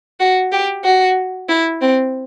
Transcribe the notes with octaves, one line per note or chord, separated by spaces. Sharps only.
F#4
G4
F#4
E4
C4